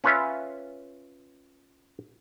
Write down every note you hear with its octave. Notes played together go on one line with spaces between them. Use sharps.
C#4 F4 B4 C#5 E5